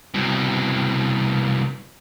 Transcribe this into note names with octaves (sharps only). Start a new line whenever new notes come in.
C2 B2